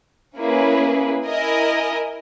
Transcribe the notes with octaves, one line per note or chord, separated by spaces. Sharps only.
A#3 C#4 E4 G#4 B4
E4 A#4 D#5 G#5